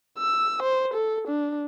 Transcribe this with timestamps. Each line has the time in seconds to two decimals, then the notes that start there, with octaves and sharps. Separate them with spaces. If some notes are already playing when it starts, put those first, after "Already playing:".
0.19 E6
0.63 C5
0.94 A4
1.28 D4